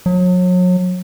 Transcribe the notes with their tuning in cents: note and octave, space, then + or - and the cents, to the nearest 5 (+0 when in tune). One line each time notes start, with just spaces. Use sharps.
F#3 -35